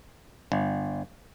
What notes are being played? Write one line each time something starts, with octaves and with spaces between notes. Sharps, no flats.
G1